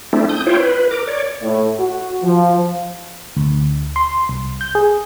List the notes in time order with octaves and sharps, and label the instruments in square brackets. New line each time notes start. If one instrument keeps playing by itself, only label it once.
[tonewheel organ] A3 C4 D4 E4
D#6 G6
E4 F4 C5 C#5 G5
B4
A#4 D6
C#5 D5
[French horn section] A2
F#4
F3
[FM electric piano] D2
C6
C2
G6
G#4